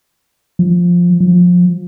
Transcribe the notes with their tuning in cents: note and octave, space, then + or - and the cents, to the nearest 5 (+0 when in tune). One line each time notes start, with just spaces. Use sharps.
F3 +5
F3 +25